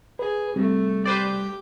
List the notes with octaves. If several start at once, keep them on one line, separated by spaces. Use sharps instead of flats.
G#4 B4
C3 G3 A3
G4 B4 C5 D5